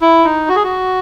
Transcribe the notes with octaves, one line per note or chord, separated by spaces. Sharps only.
E4
D#4
F#4
G#4
F#4